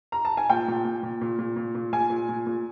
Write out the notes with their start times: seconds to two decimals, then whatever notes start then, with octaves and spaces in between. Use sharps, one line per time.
0.12 A#5
0.25 A5
0.37 G#5
0.50 A#2 G5
0.68 A#2
0.85 A#2
1.03 A#2
1.21 A#2
1.39 A#2
1.56 A#2
1.75 A#2
1.93 A#2 G#5
2.10 A#2
2.29 A#2
2.47 A#2